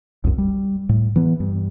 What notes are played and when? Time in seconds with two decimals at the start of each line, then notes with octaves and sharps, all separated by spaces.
0.24 C2 F#2
0.38 G3
0.89 A2
1.16 E3 B3
1.40 G2